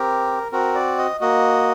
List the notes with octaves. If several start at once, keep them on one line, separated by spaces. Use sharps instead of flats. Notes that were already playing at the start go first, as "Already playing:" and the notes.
Already playing: C4 G4 A#4
C4 F#4 A#4
D5
D#5
A#3 F#4 D#5